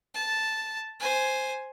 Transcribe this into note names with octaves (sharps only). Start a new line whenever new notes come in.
A5
C5 G#5